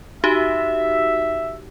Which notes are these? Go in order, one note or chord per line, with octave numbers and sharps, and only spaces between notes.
D#4 F#4 G4 E5